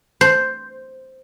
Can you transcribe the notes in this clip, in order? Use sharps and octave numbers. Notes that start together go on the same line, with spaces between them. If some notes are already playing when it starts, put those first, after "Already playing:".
C5